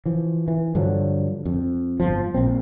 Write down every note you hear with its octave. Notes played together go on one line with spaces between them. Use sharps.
E3 F3
E3
G2 D3 F3 F#3
F2
G1 F3
A#1 A#2 C4